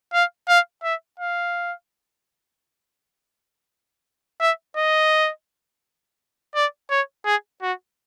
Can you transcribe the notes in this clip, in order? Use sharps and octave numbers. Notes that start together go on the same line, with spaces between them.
F5
F5
E5
F5
E5
D#5
D5
C#5
G#4
F#4